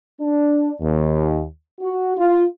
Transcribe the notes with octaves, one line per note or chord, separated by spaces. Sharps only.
D4
D#2
F#4
F4